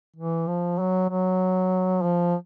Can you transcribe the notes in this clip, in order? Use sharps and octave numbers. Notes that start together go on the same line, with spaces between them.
E3
F3
F#3
F#3
F3